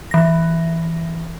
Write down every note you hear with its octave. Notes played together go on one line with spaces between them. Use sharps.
E3 A#6